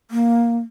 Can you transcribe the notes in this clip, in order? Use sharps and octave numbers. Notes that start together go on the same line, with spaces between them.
A#3